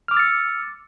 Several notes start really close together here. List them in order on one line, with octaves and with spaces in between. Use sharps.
F6 D6 E6 A6 C#7